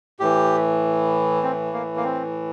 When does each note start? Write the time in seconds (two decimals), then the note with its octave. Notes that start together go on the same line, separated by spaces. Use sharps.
0.20 A2 E3 G4
1.43 C4
1.73 A#3
1.96 A#3
2.04 C4